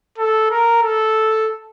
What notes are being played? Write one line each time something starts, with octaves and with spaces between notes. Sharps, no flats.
A4
A#4
A4